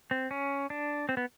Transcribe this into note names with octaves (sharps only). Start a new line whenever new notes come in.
C4
C#4
D4
C4
B3